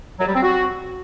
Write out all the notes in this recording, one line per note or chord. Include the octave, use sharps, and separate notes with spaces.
F#3
G3
C4
F#4